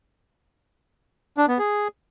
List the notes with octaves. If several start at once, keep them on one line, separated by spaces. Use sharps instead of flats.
D4
B3
G#4